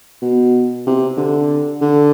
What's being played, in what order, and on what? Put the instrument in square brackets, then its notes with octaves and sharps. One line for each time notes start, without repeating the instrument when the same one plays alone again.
[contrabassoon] B2
C3
D3
D3